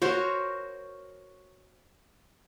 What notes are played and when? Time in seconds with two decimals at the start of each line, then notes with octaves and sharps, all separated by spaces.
0.02 F#4 A#4 C5 C#5